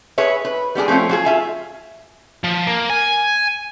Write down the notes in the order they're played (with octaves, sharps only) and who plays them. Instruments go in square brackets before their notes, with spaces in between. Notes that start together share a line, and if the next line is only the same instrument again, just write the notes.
[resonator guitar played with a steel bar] G#4 B4 C#5 E5
B4
G3 B3 D4 G#4
F3 A3 C4 C#4 F4
F#3 F4 G#4
F4 E5 G#5
[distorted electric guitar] F3
A#3
G#5